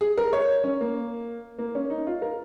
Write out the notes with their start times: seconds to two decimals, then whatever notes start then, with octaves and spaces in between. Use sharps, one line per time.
0.01 G#4
0.18 A#4
0.33 C#5
0.64 C#4
0.81 A#3
1.58 A#3
1.75 C#4
1.90 D#4
2.07 F4
2.22 A#4